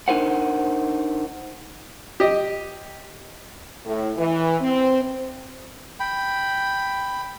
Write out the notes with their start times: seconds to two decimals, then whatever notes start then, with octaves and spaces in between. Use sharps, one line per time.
0.08 D4 D#4 A#4 C5 F#5
2.20 G4 D#5
3.85 A2
4.16 E3
4.61 C4
6.00 G5 B5